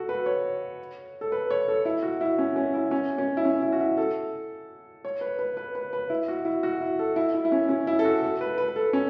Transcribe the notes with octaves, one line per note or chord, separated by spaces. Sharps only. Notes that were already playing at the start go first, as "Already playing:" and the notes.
Already playing: F#4 A4
B4
C#5
A4
B4
C#5
A4
E4
F#4
E4
C#4
C#4
E4
C#4
C#4
E4
C#4
E4
F#4
E4
A4
C#5
B4
B4
B4
B4
B4
E4
F#4
E4
F#4
E4
A4
E4
E4
E4
C#4
C#4
E4
A4
F#4
A4
B4
B4
B4
A4
C#4